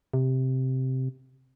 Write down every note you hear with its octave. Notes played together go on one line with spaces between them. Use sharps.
C3